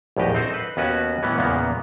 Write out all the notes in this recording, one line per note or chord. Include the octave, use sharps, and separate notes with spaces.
A#1 E2 A2 G4 D#5
C4 D#4 A4 C5
B4
D#2 B3 C#4 F#4 B4
A2 E3 B3 C#4
E2 A#2 C#3 A#3 B3